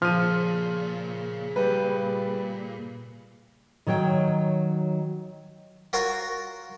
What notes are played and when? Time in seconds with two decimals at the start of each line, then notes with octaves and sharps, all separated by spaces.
0.02 A#2 C#3 F3 F6 D#7
1.56 G3 B4
3.87 D#3 F#3 C#5 G5
5.93 F4 F#4 A#4 C#5 A#5